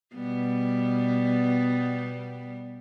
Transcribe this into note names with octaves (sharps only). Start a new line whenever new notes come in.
B2 G3 B3